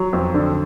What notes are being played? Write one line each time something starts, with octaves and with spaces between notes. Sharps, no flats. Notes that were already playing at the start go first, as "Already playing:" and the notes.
Already playing: F#3
F2
D3